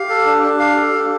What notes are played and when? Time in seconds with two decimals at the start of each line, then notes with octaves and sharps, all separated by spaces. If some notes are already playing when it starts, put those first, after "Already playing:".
Already playing: G4 F5
0.09 A4
0.26 D4
0.43 D4
0.60 F5
0.76 A4
0.93 D4